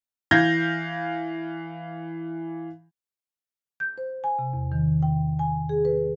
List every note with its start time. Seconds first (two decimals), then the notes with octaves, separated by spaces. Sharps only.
0.31 E3 F5 G6 G#6 A#6
3.80 G6
3.98 C5
4.24 G#5
4.39 C3
4.54 E2
4.72 D#3
5.03 G5
5.39 G#5
5.69 G#4
5.85 B4